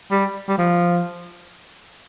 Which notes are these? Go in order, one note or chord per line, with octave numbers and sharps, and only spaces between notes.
G3
G3
F3